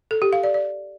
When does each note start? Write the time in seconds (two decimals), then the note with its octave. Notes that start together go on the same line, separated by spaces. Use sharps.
0.11 A4
0.22 G4
0.33 F5
0.43 D5
0.54 D5